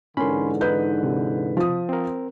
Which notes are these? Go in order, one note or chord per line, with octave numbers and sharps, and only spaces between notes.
G#2 D3 E3 C#4 A#4 B5 C6
D#4 B4 G6
C3
F3 D#6
C4 A#4